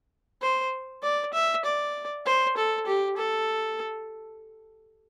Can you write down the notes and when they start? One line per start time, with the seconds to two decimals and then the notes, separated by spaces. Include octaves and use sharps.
0.42 C5
1.03 D5
1.33 E5
1.65 D5
2.26 C5
2.57 A4
2.87 G4
3.17 A4